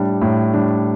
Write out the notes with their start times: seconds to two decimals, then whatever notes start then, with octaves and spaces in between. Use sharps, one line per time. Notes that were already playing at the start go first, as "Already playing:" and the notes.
Already playing: A2 G3 D4
0.21 A2
0.53 G3 D4